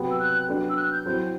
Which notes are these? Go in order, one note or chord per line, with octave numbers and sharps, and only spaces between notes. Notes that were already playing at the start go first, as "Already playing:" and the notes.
Already playing: C3 F#3 B3
E6
F#6
F#3 B3 D4
E6
F#6
G6
F#3 C4 E4